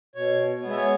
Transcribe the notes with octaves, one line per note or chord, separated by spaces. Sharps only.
B2 C#5
B3
G#3
E5
C#5